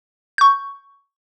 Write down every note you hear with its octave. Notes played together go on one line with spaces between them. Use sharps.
C#6 G6